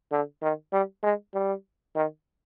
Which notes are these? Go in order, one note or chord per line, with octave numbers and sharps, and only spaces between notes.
D3
D#3
G3
G#3
G3
D#3